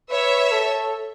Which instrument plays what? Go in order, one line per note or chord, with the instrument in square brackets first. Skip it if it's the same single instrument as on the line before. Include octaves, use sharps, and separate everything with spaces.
[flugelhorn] B4 [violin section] C#5 E5
[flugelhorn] A4